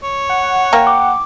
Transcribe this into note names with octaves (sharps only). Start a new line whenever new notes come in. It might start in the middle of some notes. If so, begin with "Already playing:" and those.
C#5
F#5
A#3 G5
D6